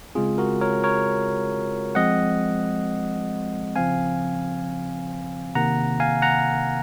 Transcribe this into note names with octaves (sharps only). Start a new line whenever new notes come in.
C#3 G#3 C4 F4 G#4
F#4 A#4
A#4 C#5
A#4 C#5
F3 G#3 C4 D#5 F#5
C#3 F3 C4 F5 G#5
C3 D#3 A#3 F#5 A#5
F5 G#5
F#5 A#5